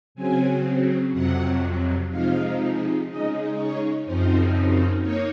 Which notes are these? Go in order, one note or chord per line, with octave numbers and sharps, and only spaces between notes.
C#3 F#3 C4 G#5
F2 C3 F#3 F#5
C3 F3 G#3 D#4 F5
C#3 G#3 D#4 D#5
C#5
F#2 C#3 F3 C4 D#4 C5
A#3 D#4 C#5